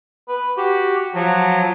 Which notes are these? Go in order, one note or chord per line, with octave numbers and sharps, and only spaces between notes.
B4
F#4 G4
F3 F#3